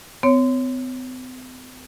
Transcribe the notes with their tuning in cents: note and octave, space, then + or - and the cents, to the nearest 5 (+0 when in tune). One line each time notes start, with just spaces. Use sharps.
C4 -45 C#5 +0